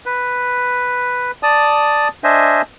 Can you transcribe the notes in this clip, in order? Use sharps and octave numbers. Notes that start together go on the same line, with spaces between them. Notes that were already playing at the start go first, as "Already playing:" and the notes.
B4
D5 A5 D#6
D4 C5 D#5 E5 G#5